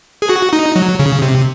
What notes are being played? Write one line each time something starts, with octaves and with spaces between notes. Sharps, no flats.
G#4
F#4
D#4
F#3
C#3
C3